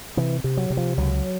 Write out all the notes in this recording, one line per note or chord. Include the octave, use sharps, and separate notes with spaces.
C3 E3
C3
F#3
C3
F3
C#2 F#3